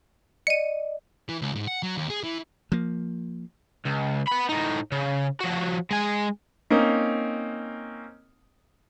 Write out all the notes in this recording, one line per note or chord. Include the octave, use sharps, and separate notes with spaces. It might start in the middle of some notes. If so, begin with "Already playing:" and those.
D5 D#5 C#7 D#7
E3
C#2
G#2
F#5
F#3
D#2
G#4
E3
F3 A#3
C#2
B3 B5
A2 D#4
C#3
F3 F#4
G#3 G#5
A#3 C4 C#4 D#4